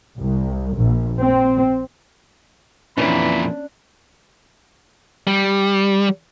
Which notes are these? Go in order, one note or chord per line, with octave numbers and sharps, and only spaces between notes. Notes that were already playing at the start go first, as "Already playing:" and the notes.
C2
A#1
C4
F2 A#2 E3 C#4 D4 B5
G3